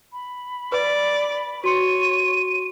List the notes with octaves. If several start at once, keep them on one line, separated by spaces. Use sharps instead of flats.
B5
B4 D5
F#4 C#5 C6 C#7 D#7